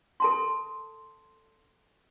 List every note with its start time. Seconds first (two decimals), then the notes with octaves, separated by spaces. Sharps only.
0.20 A4 A5 C6